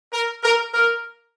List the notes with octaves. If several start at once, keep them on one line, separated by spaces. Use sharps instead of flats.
A#4
A#4
A#4